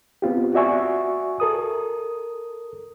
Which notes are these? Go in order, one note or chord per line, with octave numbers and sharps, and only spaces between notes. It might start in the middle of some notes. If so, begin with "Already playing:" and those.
B3 C4 F4 G4
F#4 D5 E5 G#5 C#6
A4 A#4 D#6